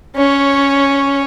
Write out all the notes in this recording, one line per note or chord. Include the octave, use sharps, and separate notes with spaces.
C#4 C#5